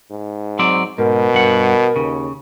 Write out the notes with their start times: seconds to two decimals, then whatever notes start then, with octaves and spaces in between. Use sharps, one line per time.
0.11 G#2
0.59 F#3 C4 D5
0.98 G#2 B2 A#4
1.34 G2 F#5
1.96 D#2 C#3